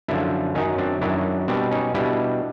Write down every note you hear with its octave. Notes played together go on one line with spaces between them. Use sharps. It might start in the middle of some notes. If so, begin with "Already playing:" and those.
F#2 D3 F3 D4 E4
F#2 D#3 F#3 C#4 D#4
C4 D4
F#2 D#3 F#3 D4 E4
B2 G3 C4 D4
C#4 D#4
B2 G3 D4 E4